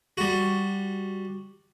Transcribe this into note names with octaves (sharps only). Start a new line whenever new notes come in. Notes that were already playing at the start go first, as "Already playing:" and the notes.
G3 F#4